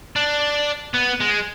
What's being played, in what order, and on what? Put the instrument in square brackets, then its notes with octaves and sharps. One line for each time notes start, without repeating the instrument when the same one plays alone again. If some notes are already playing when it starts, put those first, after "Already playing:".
[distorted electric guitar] D4
B3
G#3